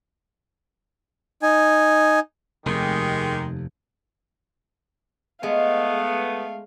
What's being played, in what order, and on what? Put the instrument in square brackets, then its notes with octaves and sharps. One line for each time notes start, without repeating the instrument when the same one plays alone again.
[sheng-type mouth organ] D#4 G#5
[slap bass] F1 D#2 [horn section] D#3 G#3 G4
[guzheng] G#3 [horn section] A3 B3 [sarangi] F5